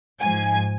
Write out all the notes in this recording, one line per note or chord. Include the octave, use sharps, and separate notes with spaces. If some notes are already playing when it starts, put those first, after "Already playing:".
G#2 F3 G#5